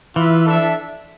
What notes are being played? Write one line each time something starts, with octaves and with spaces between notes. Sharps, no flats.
E3 F4 B4 E5
D4 A4 E5